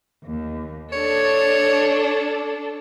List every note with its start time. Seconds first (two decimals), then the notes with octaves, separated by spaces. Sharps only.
0.23 D#2
0.92 D4 A4 C#5